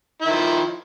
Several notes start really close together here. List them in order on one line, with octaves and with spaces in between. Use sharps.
E4 D#3 F3